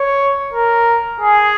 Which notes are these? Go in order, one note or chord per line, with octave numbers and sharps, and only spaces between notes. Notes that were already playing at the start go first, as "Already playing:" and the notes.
Already playing: C#5
A#4
G#4